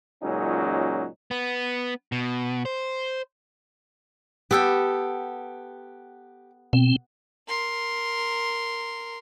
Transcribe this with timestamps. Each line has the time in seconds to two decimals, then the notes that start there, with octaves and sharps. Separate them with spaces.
0.23 C#2 A#2 F#3 C#4 D#4
1.31 B3
2.12 B2
2.65 C5
4.51 B3 G4 A4 G5
6.73 B2 C4
7.48 A#4 C6